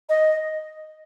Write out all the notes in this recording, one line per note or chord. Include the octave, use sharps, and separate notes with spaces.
D#5